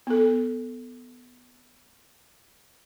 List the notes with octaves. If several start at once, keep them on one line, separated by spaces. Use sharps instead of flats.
B3 A4